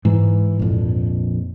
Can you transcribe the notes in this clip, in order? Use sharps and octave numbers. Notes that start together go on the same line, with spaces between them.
G#2 E3
A#1 F2